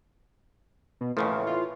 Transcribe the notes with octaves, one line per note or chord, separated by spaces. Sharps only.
B2
D#2 A2 C#3 E3 F3 A3
F4